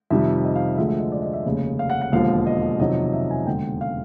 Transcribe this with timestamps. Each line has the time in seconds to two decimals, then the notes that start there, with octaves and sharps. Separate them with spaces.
0.10 F2 C3 D#3 G3 E5
0.45 D#5
0.55 F5
0.78 D2 D3 F3 G#3 E5
0.89 E5
1.00 D#5
1.12 D5
1.22 D#5
1.33 E5
1.45 F1 D#2 C#3
1.79 F5
1.90 F#5
2.02 F#5
2.12 E1 D#2 D3 F3 F5
2.47 D#5
2.80 F2 C3 D#3 F#3 D#5
3.13 E5
3.31 G#5
3.46 E1 D#2 D3 G5
3.81 F5